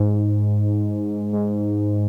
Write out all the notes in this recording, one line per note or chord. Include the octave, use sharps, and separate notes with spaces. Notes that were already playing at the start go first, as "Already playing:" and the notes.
Already playing: G#2
G#2